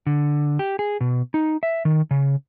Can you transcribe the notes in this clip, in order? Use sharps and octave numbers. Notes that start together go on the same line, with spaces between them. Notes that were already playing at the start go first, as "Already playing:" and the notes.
D3
G4
G#4
B2
D#4
E5
D#3
C#3